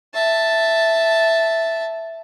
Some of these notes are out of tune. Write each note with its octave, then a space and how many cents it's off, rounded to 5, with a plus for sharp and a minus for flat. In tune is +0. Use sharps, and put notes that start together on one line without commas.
E5 +0 A5 +0